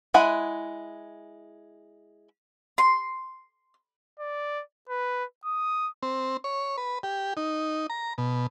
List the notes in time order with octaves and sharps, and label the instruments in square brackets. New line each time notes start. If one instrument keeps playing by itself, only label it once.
[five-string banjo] G#3 E4 F#5 G#5
[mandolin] C6
[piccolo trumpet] D5
B4
D#6
[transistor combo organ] C4
C#5
B4
G4
D#4
A#5
B2